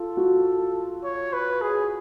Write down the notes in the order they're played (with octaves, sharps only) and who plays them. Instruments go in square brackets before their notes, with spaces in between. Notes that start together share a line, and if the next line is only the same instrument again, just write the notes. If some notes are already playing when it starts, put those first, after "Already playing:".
Already playing: [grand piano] F4 [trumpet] A4
[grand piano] F#4
[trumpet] C#5
B4
G#4